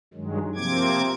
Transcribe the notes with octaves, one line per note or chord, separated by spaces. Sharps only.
G2 D#3 F#3 G#3
C3 F3 A#3 C4 D6 G#6